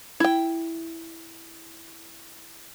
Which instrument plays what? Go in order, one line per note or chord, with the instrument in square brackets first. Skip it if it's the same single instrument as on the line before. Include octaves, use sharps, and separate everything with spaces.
[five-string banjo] E4 G5